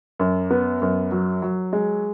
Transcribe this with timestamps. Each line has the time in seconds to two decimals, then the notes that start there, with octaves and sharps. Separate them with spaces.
0.19 F#2
0.50 B3
0.82 F#2
1.11 F#3
1.42 F#3
1.73 G#3